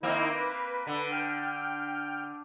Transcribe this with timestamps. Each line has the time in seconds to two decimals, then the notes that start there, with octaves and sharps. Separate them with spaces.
0.03 D#3 A#3 C4 D#4 E4
0.34 B4
0.87 D3
1.12 G5 F6